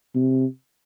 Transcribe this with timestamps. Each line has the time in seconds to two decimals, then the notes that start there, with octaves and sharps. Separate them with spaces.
0.15 C3